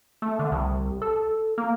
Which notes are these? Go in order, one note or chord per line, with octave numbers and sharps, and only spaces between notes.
A3
D3
C2
A4
A#3